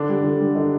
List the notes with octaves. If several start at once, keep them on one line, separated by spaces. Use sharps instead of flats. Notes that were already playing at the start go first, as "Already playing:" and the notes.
Already playing: D3 D4
G3
D3
G3
D3 D#4